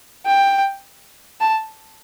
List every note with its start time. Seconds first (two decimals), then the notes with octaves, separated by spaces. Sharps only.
0.26 G5
1.40 A5